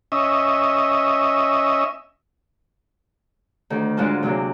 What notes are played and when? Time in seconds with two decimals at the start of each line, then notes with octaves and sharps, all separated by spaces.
0.12 C#4 D#5 E5
3.70 D2 D#3 A3
3.97 G#2 D3 G#3 F4 F#4 A5
4.23 C3 F#3 G#3 A#3 D4